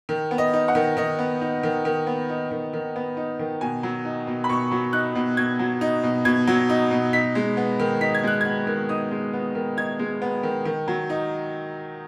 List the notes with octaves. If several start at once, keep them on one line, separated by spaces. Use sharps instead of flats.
D#3
B3
D#5
D#4
F#5
D#3
D#3 D#5
B3
D#4
D#3
D#3
B3
D#4
D#3
D#3
B3
D#4
D#3
B2 G#5
F#3
D#4
B2
B5
B2 C#6
F#3
D#4 F#6
B2
B2 G#6
F#3
D#4
B2
B2 G#6
F#3
D#4
B2
D#4 B6
G#3
B3
D#3
D#4 B6
G#6
G#3 F#6
B3 G#6
D#3
D#4 D#6
G#3
B3
D#3
D#4 G#6
G#3
B3
D#3
D#3
F#3
D#4